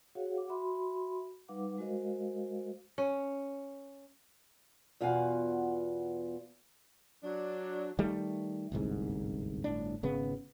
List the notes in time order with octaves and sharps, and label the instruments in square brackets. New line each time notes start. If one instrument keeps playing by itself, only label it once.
[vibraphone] F#4 G#4 C#5 F5 F#5
F#5 D6
F#4 E5 B5 C6
G3 D#4 B4 F5 F#5 D6
G#3 F#4 A#4 C5 D#5 F5
[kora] C#4
[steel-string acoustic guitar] E2 B2 F4 F5 F#5 G#5
[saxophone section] F#3 D4
[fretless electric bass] D#3 G3 A3
D1 G1 C2 G#2
G1 A2 D4
G#1 C#3 B3